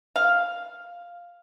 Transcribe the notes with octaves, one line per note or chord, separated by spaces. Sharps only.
F5